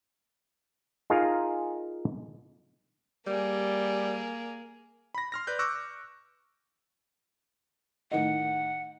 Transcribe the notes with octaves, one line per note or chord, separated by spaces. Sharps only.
D#4 F4 G#4 A#4 F5 G#5
G3 A#3 G#4
B5 A#6
C6 F6 A#6
B4 D5 F#6 G6
C#6 D6 E6 F#6 G6 A#6
A2 D#3 D#5 F#5